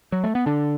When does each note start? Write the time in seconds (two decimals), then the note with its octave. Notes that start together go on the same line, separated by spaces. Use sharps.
0.12 F#3
0.24 A3
0.35 B3
0.46 D3 D4